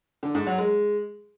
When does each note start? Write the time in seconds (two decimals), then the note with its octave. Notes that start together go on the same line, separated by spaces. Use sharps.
0.23 D3
0.35 G#2
0.46 F#3
0.58 G#3